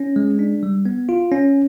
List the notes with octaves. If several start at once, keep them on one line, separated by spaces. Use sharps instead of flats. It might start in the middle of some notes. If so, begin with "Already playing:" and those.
Already playing: C#4
G#3
D4
G3
B3
F4
C#4